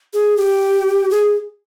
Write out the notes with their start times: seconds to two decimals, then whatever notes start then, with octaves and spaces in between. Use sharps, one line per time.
0.14 G#4
0.37 G4
1.11 G#4